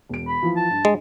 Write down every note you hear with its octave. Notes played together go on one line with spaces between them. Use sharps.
E1 D7
B5
E3 F3
A5
G2
G#3